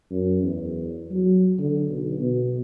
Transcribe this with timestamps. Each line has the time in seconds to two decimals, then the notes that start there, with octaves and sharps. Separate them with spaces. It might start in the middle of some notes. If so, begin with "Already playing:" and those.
0.11 F#2
0.42 E2
1.11 F#3
1.59 D3
1.89 B1
2.19 B2